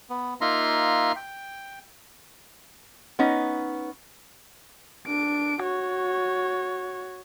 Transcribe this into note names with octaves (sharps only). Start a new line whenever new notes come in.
B3
A#3 D#4 F4 E5 A#5 C6
G5
B3 C#4 D#4
D4 D7
F#4 C#5